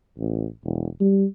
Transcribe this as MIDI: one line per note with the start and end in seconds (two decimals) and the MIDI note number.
0.18 0.46 33
0.64 0.87 28
1.00 1.25 55